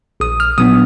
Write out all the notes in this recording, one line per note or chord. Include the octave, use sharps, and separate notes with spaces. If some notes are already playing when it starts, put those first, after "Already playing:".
A#1 D#6
F6
A#2 F#3 B3 D4 D#6